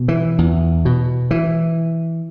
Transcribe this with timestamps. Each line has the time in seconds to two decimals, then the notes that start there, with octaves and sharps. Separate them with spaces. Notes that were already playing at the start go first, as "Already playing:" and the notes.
Already playing: B2
0.08 E3
0.38 E2
0.85 B2
1.31 E3